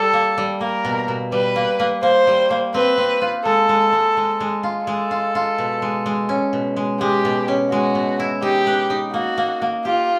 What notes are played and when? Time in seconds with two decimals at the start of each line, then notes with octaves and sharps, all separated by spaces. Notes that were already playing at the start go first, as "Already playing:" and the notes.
Already playing: G3 A4
0.13 A#3
0.38 G3
0.61 A#3 A#4
0.85 B2
1.08 B2
1.32 G3 B4
1.56 A#3
1.80 A#3
2.03 A#3 C5
2.27 G3
2.50 A#3
2.74 C4 B4
2.98 C4
3.22 F4
3.45 G#3 A4
3.69 G#3
3.92 G#3
4.17 G#3
4.40 G#3
4.63 F4
4.87 G#3 A4
5.11 F4
5.35 F4
5.58 B2
5.82 G#3
6.06 G#3
6.29 C#4
6.53 B2
6.76 G#3
7.00 G#3 G4
7.25 B2
7.48 C#4
7.71 G#3 F#4
7.95 B2
8.20 E4
8.42 D#4 G4
8.67 B4
8.90 D#4
9.13 A#3 F#4
9.38 A#3
9.62 A#3
9.85 F4 G4